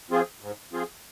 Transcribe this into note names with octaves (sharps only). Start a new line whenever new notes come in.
F3 C4 F4 G#4
G#2
F3 C4 F4 G#4